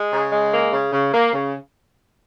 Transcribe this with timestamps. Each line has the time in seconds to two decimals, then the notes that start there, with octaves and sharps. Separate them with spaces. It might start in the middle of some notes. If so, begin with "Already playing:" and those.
Already playing: G#3
0.12 C#3
0.31 G#3
0.51 A#3
0.72 C#3
0.92 C#3
1.13 A#3
1.33 C#3